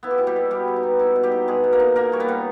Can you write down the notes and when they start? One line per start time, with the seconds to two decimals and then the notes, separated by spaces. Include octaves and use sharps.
0.03 B3 E4
0.11 G4
0.18 B2 E4
0.27 G3 G4
0.36 B2
0.51 G3 B3 G4
0.68 G3
0.76 D#4
0.83 B3
0.99 D#4 E4
1.16 B2
1.23 G3 G4
1.32 D#4
1.48 B2 G#3 G#4
1.64 B2
1.73 A#3 A#4
1.80 D#4
1.96 A#2 A#3 A#4
2.12 G3 C#5
2.20 B3 B4
2.28 G3